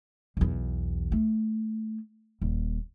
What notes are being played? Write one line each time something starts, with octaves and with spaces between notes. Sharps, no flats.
B1 E2
A3
D#1